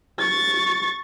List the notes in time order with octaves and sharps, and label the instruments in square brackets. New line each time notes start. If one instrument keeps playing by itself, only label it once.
[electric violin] C#6 A6